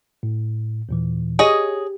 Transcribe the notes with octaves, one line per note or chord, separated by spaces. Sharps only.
A2
D#2 A#2 E3
G4 G#4 C#5 D#5